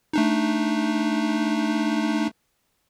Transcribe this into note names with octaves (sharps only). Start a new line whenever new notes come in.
A3 D4 D#4